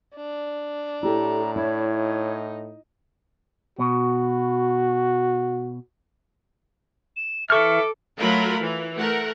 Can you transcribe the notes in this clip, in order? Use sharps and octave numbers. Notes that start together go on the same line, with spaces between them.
D4
A2 E4 G4 A4 A#5
E4 C#5
D#4
B2 F#4
E7
E3 A4 E5 C#6 D6 F6
F#3 A3 F4 A#4 C#5 B5
E3
A3 A#4 F#5